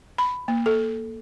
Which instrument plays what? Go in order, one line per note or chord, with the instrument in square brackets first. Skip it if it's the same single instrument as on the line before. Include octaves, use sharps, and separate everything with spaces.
[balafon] B5
A#3
A4